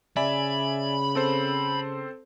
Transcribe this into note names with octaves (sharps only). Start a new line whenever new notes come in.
C#3 D5 E5 G#5 B5
C4 A4 C5